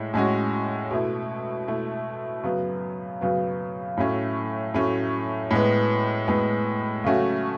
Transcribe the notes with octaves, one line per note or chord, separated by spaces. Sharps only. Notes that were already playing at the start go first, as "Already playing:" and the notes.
Already playing: A2 G#3
A2 G#3 C#4 F#4
B2 A3 E4
B2 A3 E4
F#2 C#3 F#3 B3
F#2 C#3 F#3 B3
A2 F#3 A3 C#4
A2 F#3 A3 C#4
A2 G#3 B3
A2 G#3 B3
C#3 F#3 A3 C#4 F#4